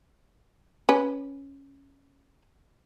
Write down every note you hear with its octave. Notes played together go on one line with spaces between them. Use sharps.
C#4 B4